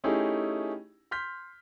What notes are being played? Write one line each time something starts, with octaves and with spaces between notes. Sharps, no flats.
A3 C#4 D#4 E4 G4 G#4
C6 F6 G6 B6